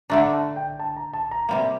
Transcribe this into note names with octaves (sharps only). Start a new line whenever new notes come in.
D3 A3 D4 A#5
A5
G5
A5
A#5
A5
A#5
C3 G3 A#3